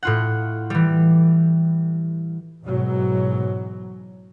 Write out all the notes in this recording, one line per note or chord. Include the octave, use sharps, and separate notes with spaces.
A2 F4 F#5
E3 G3
G#2 B2 E3 F#3